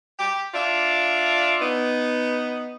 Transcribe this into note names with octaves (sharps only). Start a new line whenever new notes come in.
G4
D4 F4 D5 E5
B3 D#4